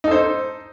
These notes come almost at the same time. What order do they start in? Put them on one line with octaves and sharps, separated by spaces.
D#4 A4 C5